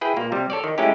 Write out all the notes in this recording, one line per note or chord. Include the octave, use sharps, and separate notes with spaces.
E4 G#4 B4 G5
A#2 A#3
C3 G3
A4 C#5 D5
D#3
G#3 A3 C#4 D#4 E4 G4